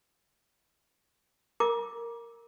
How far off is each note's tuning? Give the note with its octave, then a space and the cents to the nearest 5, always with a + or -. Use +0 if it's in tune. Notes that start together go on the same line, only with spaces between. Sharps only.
A#4 -5 A#5 +35 D6 +0